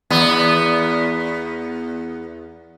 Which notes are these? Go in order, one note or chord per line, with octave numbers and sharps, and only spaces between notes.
E2 B3